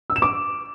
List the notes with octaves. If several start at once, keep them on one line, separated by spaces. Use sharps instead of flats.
E6
E7
D6